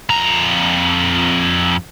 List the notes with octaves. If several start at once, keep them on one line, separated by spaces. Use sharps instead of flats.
F2 A#5